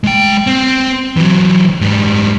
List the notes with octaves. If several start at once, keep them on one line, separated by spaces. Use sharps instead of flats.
G#3 G5
C4
E3 F#3
G#2 G3